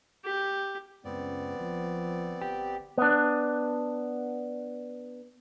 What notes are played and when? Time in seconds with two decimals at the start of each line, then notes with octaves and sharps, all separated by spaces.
0.25 G4
1.05 C#2 F#2 B3 C4 D5
1.60 G1 F3
2.42 G1 G4
2.98 B3 D4